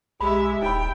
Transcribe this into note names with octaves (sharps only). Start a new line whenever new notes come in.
B1 G#3 G4 E5 B5
D#1 D#4 G5 B5